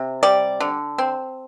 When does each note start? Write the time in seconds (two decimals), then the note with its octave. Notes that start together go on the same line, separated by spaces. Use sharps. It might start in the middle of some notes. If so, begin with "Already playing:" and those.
Already playing: C3
0.23 G3 D5
0.60 D3
0.98 C4